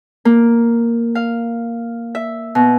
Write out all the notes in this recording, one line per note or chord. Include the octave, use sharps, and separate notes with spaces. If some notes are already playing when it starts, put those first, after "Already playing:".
A#3
F5
E5
B2